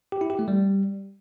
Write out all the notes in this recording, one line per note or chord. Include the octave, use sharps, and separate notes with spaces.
G4
E4
G4
A3
G3